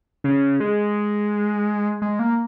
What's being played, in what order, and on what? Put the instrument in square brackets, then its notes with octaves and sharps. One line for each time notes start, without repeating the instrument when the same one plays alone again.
[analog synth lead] C#3
G#3
G#3
A#3